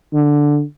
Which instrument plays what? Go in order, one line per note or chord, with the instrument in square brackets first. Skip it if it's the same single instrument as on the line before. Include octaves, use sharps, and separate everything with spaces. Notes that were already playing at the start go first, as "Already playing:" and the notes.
[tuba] D3